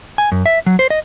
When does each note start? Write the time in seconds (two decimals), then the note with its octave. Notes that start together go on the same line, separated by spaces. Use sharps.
0.18 G#5
0.32 F#2
0.46 E5
0.66 F#3
0.79 C5
0.90 D#5